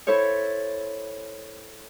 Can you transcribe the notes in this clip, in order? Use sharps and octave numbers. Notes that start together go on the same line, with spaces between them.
E4 A4 C5 C#5